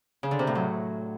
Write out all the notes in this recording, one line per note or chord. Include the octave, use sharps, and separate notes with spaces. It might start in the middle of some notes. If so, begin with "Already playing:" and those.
C#3
D3
C3
A2
F#3